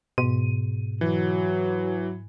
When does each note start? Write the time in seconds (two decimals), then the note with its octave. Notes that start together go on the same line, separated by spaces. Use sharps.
0.18 G#2 B2 D#7
1.01 E3 F#3